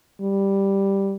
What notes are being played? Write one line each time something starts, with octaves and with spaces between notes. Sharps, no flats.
G3